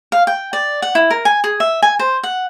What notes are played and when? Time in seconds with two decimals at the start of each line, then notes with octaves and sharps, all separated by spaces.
0.12 F5
0.27 G5
0.53 D5
0.82 F#5
0.95 E4
1.10 A#4
1.25 G#5
1.44 G#4
1.60 E5
1.82 G#5
1.99 C5
2.23 F#5